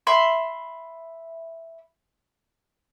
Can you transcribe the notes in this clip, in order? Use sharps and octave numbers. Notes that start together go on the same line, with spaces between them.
E5 B5 C6